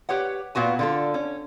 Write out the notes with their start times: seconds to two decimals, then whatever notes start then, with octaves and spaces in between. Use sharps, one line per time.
0.09 G4 B4 C#5 F#5
0.55 A#2 B3 F#4 G#5
0.79 D3 F4 A4
1.14 C#4